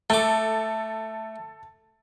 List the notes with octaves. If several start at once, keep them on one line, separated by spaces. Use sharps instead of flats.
A3 A4 D6